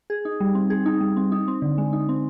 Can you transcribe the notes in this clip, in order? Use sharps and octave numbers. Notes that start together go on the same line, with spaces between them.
G#4
D#4
G3
C4
G#4
D#4
G3
C4
D#4
C4
D3
G#3
D#4
C4